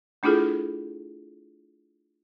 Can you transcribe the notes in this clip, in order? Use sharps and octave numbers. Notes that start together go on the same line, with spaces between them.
A3 D4 E4 F4 G#4 A4